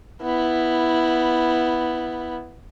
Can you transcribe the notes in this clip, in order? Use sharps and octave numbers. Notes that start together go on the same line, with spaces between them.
B3 E4